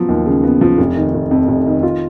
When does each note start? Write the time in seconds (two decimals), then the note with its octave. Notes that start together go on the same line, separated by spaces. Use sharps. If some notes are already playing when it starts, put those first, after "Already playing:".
Already playing: F3 F#3 B3
0.09 D#2
0.26 C#3
0.43 B3
0.61 F3
0.78 F1
0.96 D#3
1.14 F1
1.31 F2
1.48 F1
1.66 D#3
1.83 F4